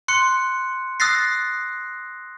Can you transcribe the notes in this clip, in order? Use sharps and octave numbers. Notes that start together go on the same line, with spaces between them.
C6 F#6 C#7
D#6 E6 F#6 A6 A#6 C7